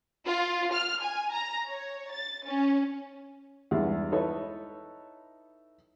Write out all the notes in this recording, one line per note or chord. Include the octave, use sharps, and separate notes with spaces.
F4
F6
G#5
A#5
C#5
A6
C#4
E2 G2 D#3 G#3 E4
D#4 E4 A4 B4 C#5 D#5